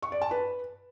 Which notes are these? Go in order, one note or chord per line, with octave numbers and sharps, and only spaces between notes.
C#6
D5
A5
B4